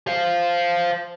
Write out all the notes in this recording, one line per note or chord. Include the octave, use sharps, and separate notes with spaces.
C5 F5